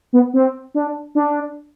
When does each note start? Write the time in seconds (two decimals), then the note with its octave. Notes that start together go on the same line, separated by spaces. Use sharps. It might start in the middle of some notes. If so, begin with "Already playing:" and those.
0.13 B3
0.34 C4
0.75 D4
1.15 D4